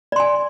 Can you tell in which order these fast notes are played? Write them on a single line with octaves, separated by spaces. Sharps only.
D5 C6 G#5